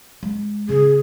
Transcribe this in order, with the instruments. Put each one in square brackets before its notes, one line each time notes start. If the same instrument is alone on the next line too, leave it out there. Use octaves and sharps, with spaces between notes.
[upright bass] G#3
[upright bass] C#3 [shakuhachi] G#4